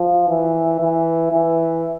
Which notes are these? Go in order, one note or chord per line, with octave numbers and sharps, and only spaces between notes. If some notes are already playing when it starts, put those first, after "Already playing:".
Already playing: F3
E3
E3
E3